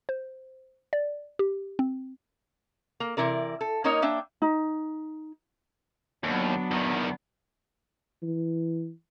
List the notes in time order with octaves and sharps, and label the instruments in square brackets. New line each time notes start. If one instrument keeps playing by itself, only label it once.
[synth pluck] C5
D5
G4
C4
[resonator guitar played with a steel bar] A#3
C3 E3 E4 A#4 D5
A4
A#3 C#4 D#4 A#4 C#5 D#5
A#3 D4 E5 G5
[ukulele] D#4
[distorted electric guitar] D#2 [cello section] F#3 B3 D4
[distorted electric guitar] E2 D#3
[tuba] E3